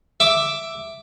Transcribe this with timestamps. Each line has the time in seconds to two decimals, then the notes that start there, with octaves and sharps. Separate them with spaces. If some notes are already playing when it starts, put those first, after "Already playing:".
0.20 E5 D6